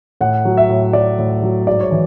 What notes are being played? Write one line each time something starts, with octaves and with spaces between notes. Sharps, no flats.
A2 F#5
F#3
E5
A2
F#3 D5
A2
F#3
G#2 D5
C#5
E3